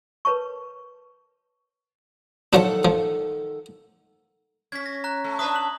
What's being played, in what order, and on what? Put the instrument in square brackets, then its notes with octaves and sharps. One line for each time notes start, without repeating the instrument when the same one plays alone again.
[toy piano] A#4 B4 C#5 A5 C#6
[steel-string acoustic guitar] D#3 A4 F#5 [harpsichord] F3 F#3 D4
[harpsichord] F3
[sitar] C#4 [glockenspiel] G#6 B6
[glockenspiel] A#6
A#5 F#6
[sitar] A3
[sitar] D4 B4 E5 [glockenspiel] D#6 F#6
[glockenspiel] F#7